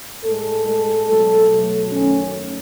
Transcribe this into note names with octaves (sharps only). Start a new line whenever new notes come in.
A2 G#3 A4
A2 G#3 A4
B2 F#3 A3
B2 F#3 A3
F#2 D#3 A3 C#4